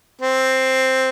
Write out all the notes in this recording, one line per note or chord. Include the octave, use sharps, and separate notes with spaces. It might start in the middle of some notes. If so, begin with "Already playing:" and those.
C4